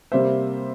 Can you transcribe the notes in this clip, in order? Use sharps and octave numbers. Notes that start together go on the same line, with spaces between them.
C3 G3 A#3 C5 E5